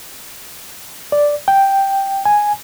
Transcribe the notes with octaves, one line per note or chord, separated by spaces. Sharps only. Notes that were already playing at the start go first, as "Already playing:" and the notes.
D5
G5
G#5